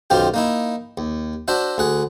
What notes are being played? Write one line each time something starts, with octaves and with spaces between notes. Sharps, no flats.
B1 F#2 D#3 C4 F4 G4
A#3 D#4 E4
D#2
D4 F#4 C5 E5
D2 G#4 F#5